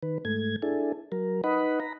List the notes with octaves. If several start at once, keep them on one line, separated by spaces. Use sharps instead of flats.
D#3 B4
G#2 A3 G#6
D4 E4 G#4 A4
F#3 A#4
D#4 B4 D#5 F#5 B5
A#5 B5